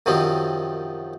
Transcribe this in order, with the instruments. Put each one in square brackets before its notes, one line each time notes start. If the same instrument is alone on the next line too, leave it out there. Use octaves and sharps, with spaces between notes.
[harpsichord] F#2 C3 D#3 F3 C4